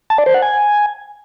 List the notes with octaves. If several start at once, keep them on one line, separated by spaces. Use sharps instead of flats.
A5
D5
C5
F#5
G#5